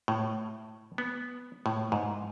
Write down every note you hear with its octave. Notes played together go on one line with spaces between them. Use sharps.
A2
B3
A2
G#2